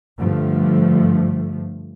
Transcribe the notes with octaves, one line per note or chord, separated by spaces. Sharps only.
G2 D3 F3 A3